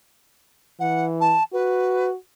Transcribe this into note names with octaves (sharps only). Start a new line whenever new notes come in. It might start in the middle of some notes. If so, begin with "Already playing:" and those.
E3 F#5
A5
F#4 B4